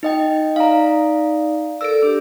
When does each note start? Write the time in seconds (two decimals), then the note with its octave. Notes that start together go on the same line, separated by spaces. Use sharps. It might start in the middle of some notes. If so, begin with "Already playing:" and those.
0.03 D#4 D#5 G5
0.56 D#4 D5 F5 A#5
1.81 A4 A#4 D5 E6 D7
2.02 D4 G4